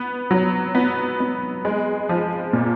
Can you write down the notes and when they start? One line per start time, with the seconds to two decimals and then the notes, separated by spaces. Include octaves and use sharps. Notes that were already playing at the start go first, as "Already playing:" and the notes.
Already playing: B3
0.31 F#3
0.75 B3
1.20 B3
1.65 G#3
2.09 F3
2.53 A#2